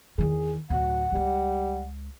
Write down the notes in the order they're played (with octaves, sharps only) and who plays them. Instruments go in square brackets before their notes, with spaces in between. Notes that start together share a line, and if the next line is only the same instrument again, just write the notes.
[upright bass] E2 D#3 [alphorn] G#4
[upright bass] D2 A2 [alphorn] F#3 [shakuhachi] F#5
[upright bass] C#2 G#3 [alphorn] G3